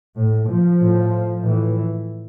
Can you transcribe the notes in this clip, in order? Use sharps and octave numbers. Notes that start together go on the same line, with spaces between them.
A2
F3
A2
A2 E3